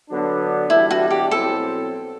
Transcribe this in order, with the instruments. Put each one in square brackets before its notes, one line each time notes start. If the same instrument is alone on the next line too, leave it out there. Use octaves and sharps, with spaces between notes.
[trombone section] D3 F#3 B3 D4
[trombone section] E2 B2 G3 D4 [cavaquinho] E4
[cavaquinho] F#4
G4
[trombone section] B2 F#3 C4 E4 [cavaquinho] A4